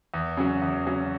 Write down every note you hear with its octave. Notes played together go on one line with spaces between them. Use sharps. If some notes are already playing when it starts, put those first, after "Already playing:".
E2
C#3 F#3 C#4 F#4
E2
C#3 F#3 C#4 F#4